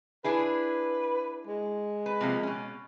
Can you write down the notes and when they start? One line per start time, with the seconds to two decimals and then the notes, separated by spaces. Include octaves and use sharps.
0.24 D4 E4 G#4 B4
1.47 G#3
2.06 B4
2.21 C3 F3 A#3
2.43 B2 C#4